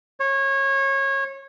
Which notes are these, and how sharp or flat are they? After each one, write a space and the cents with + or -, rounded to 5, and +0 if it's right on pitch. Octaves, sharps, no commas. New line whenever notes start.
C#5 -25